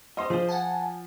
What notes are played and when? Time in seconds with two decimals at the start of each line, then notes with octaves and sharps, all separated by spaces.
0.17 G3 C5 D#5 C6
0.30 F3 G#4 C5
0.49 F#5 G#5 A5